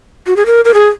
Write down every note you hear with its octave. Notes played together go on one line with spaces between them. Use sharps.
F#4
G#4
A#4
A#4
G#4